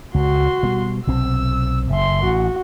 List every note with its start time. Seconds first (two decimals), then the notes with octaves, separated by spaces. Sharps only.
0.14 C#2 F#4 C6
0.63 B2 G3
1.07 B1 C3 C4 E6
1.90 F#1 E5 C6
2.24 A1 F#4